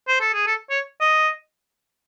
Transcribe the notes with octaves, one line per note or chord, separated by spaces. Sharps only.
C5
A4
G#4
A4
C#5
D#5